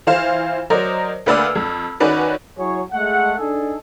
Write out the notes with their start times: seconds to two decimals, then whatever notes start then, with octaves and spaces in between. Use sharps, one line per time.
0.07 E3 F4 C5 F5 E7
0.70 F#3 A#4 C5 D5 D#5
1.26 D2 A#3 B4 D5 E6 F6
1.55 F2
2.00 D#3 C#4 F#4 B4 D5
2.59 F#3 E4 G#4 C#5
2.92 G#3 A3 F#5
3.39 D4 D#4 G#4 A4